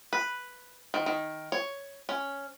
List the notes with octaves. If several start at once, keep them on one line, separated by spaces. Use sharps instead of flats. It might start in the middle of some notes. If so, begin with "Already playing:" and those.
B4
D#3
D#3
C#5
C#4